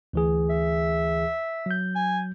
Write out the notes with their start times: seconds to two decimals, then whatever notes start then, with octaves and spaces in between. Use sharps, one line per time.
0.13 D2 E3 G#4
0.50 E5
1.66 F#3 G6
1.96 G#5